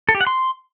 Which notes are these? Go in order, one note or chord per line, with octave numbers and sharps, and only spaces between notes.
A4
G4
F#5
C6